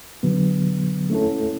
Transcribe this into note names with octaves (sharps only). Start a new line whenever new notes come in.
D3 F#3 B3
A3 C#4 E4 A4